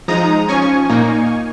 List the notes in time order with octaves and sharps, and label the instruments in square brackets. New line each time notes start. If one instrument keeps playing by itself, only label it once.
[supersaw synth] F3 G#3 D#4 A#5 D#6
F3 C#4 G#5 C#6
A#2 A#3 D#4